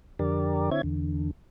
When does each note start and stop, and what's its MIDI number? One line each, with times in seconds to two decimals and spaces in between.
0.19 0.70 41
0.19 0.70 50
0.19 0.70 67
0.19 0.70 70
0.19 0.70 74
0.71 0.82 50
0.71 0.82 60
0.71 0.82 64
0.71 0.82 73
0.71 0.82 76
0.71 0.82 92
0.83 1.31 40
0.83 1.31 50